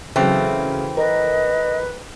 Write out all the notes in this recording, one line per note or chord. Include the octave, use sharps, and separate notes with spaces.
C#3 E3 F#3 A3 C4
A#4 B4 D#5